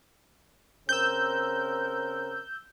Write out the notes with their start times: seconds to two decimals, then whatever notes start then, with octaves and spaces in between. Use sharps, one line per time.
0.89 C#3 C4 A#4 E6 G6